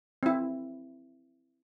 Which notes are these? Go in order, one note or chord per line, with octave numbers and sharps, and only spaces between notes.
C4 E4